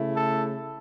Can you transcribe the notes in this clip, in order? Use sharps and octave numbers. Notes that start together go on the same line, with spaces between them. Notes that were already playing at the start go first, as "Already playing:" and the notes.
Already playing: C#3 A3 E4
A4